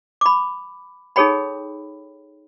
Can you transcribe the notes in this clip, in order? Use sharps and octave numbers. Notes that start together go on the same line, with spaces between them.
B5 D6
D#4 G#4 A4 C#5 G5 B5